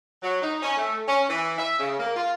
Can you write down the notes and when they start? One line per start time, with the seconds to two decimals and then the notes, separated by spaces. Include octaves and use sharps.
0.22 F#3
0.42 D#4
0.63 C#4
0.77 A3
1.08 C#4
1.30 E3
1.59 E5
1.79 C#3
1.99 A#3
2.16 F4